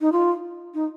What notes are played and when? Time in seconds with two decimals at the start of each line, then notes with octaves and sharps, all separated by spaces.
0.01 D#4
0.12 F4
0.74 D#4